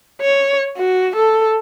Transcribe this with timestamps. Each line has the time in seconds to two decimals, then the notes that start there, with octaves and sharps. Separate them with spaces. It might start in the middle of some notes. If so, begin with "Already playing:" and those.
0.21 C#5
0.77 F#4
1.16 A4